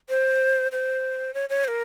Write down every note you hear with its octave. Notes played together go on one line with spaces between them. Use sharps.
C5
C5
C#5
C#5
C5
A#4